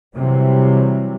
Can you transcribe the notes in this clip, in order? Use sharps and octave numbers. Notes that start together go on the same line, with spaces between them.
C3 E3 F#3 G3